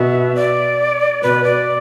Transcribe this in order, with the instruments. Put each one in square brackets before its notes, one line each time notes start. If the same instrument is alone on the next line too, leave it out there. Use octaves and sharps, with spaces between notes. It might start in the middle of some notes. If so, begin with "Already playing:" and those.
Already playing: [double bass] B2 [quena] E5
[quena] D5
[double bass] B2 [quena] B4
[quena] D5